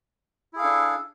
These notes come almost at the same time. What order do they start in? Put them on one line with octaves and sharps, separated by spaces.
E4 G#4 F5 A4 D4